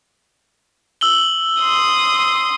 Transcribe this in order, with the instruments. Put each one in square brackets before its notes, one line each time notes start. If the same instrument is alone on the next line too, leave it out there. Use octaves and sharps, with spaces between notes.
[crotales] E6 F#7 G7
[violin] C6 D#6